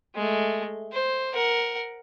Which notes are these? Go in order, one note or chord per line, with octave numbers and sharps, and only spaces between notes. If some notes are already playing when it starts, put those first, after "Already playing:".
G#3 A3
C5
A#4 F#5